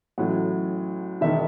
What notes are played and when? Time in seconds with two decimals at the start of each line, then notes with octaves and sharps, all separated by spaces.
0.18 A1 A2 F#3 F#5
1.21 E1 D#3 E5